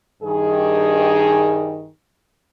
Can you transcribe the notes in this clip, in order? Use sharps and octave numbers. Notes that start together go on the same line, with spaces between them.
G2 D#3 G#4